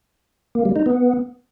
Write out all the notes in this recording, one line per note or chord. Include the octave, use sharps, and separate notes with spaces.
A#3
G3
D#4
B3